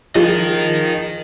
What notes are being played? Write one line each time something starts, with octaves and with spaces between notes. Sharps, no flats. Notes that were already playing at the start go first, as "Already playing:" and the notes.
F3 G#4 A#4 D#5